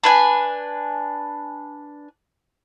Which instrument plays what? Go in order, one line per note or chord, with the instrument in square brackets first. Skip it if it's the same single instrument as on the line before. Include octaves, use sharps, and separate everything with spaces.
[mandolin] D4 B4 G#5